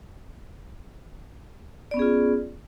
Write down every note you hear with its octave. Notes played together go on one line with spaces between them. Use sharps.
B3 C#4 F4 G#4 D5